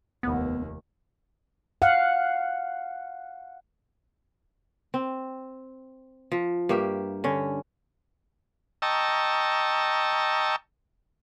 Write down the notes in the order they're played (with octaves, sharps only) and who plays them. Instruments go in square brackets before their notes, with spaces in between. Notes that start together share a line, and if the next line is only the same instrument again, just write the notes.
[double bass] F1 D#2 [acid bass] B3
[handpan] F5 F#5
[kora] C4
F3
G2 A#3 G4 E5
D3 C#4
[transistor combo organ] D#5 G5 A5 A#5 C#6 E6